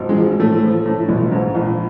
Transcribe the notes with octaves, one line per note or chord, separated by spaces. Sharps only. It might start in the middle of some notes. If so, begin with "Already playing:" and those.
Already playing: G#1
G#3
F3
A2 A3
F3
A2
B1
G#2
A#1